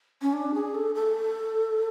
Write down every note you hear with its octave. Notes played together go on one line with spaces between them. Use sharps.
C#4
D4
G#4
A4
A4